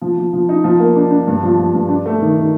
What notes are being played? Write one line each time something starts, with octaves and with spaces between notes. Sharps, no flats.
F3
F3
F3
D#4
F3
A#3
D4
D4
G2
F3
F3
G2
D4
A3
D#3
D#3